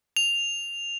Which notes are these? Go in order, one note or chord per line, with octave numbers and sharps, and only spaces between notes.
F7